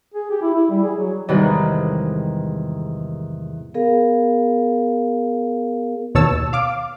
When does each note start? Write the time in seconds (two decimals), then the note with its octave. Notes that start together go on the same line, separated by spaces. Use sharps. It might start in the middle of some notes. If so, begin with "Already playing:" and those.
0.14 G#4
0.30 G4
0.42 E4
0.53 E4
0.70 G3
0.83 G#4
0.97 F#3
1.28 E2 G#2 C3 D#3 G3 B4
3.74 B3 G#4 A#4 F5
6.15 D#2 B2 C#5 A5 E6
6.53 F5 D6